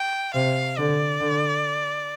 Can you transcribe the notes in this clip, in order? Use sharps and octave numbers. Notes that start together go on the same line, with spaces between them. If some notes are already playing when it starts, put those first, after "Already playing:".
Already playing: G5
C3 F5
D3 D5
D3